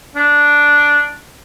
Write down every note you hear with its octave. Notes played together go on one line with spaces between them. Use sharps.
D4